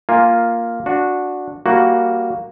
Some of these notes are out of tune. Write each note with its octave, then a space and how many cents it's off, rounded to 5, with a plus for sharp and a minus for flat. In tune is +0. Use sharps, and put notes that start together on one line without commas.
A#3 +0 F4 +0 G#5 +0
D4 +0 F#4 -15
G3 +0 A#3 +0 F#4 +5